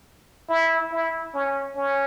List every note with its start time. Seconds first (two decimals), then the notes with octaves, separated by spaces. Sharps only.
0.50 E4
0.92 E4
1.34 C#4
1.77 C#4